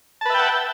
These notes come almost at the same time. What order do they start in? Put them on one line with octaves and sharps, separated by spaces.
A5 B4 E5 G5 F#5